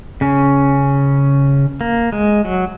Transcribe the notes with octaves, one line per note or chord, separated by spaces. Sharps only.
C#3 C#4
A#3
G#3
F#3